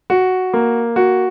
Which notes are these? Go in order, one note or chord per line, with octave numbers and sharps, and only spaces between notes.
F#4
A#3
F#4